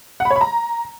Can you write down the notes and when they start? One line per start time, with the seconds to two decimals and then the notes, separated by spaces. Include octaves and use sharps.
0.20 F#5
0.25 B5
0.31 C#5
0.36 B5
0.41 A#5